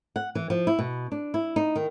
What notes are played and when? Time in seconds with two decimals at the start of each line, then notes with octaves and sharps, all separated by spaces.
0.16 F#5
0.35 E3
0.50 F3
0.67 E4
0.79 B2
1.12 D4
1.34 E4
1.56 D#4
1.76 D#3